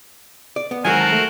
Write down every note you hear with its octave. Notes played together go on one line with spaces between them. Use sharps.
D5
B3
D#3 F#3 G#3 F#4 A#4 C5 G#5
A5
A3